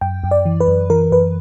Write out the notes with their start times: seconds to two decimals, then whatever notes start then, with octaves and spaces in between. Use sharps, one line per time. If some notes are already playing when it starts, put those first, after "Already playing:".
0.01 F#2 G5
0.24 F#2
0.31 D5
0.45 E3
0.60 B4
0.68 F#2
0.90 E3 A#4
1.12 F#2 B4